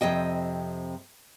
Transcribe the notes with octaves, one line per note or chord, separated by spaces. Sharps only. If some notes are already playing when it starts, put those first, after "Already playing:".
F2 C3 D#5 G5